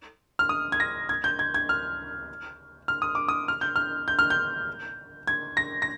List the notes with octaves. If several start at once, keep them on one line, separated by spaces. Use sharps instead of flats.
F6
D#6
G#6
A#6
G#6
G6
G#6
G#6
F6
F6
D#6
D6
D#6
F6
G6
F6
G6
F6
G6
G#6
A#6
A#6